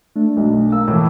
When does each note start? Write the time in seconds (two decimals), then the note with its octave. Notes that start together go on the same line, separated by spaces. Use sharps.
0.16 A3 D4
0.37 B1
0.72 A#3 E6
0.88 A2 E3